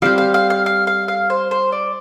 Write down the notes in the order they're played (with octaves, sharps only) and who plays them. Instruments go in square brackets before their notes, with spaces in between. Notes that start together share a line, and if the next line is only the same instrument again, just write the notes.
[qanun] G3 C4 G4 [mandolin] F5
[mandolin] F5
F5
F5
F5
F5
F5
C5
C5
D5